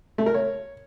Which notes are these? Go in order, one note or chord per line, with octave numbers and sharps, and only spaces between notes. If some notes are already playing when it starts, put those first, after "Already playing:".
A3
A#4
C#5